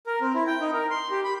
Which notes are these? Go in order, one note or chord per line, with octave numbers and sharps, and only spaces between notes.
A#4
C4
E4
G5
D#4
A#4
C6
G4
B5